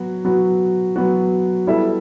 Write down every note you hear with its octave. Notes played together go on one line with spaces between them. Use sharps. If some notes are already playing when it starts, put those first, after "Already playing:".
Already playing: F#3 B3 F#4
F#3 B3 F#4
F#3 B3 F#4
G3 B3 E4 A4 E5